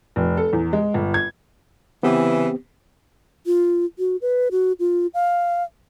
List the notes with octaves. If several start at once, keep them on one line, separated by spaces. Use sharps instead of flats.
F1
A4
E2
G#3
G1
G#6
C#3 E3 B3 C4 G4
F4
F#4
B4
F#4
F4
F5